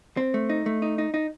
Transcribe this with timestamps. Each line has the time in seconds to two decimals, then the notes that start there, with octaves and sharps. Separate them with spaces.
0.17 C4
0.34 A3
0.49 D#4
0.66 A3
0.82 D#4
0.98 D#4
1.14 D#4